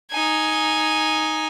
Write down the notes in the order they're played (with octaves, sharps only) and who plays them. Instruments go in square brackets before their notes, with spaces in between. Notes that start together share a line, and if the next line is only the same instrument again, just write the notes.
[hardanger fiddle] D#4 G#5